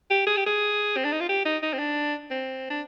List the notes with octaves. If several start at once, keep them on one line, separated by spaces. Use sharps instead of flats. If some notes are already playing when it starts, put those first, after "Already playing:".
G4
G#4
G4
G#4
C4
D4
D#4
F4
G4
D#4
D#4
C4
D4
C4
D4